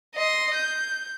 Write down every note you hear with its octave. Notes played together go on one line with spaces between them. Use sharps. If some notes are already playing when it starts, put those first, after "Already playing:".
D#5 C6
G6